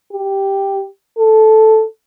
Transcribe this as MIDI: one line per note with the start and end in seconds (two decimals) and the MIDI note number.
0.13 0.83 67
1.18 1.84 69